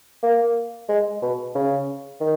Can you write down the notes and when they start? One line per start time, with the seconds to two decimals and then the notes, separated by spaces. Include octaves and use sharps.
0.23 A#3
0.89 G#3
1.22 B2
1.55 C#3
2.20 D#3